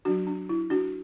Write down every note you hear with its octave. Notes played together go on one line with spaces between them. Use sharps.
F#3 D4 F#4
D4
E4
D4 F#4